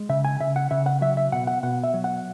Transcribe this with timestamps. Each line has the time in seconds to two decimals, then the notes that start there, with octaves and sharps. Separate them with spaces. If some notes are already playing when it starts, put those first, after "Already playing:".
Already playing: G#3
0.09 C#3 E5
0.25 G#5
0.40 C#3 E5
0.56 F#5
0.71 C#3 E5
0.86 F#5
1.01 F#3 E5
1.17 E5
1.32 B2 F#5
1.47 F#5
1.63 B2 F#5
1.84 E5
1.94 F#3
2.04 F#5